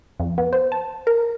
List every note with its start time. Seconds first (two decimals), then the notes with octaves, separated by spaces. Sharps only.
0.20 F2
0.38 B3
0.53 C5
0.72 A5
1.07 A#4